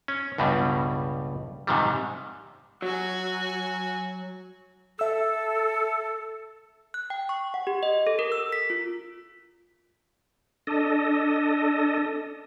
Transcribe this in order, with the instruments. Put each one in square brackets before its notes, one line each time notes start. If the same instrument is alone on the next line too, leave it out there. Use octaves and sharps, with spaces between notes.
[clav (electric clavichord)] C#4
C#2 G2 B2 G3
G#2 C3 D#3 G3
[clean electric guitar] F#3 [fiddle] F#4 G#5
[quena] A4 [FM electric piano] E5 E6
[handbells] F#6
G5
C#6
F#5
G4
D#5
A4
A#4
E6
B6
F4
[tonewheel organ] D4 A4 D#5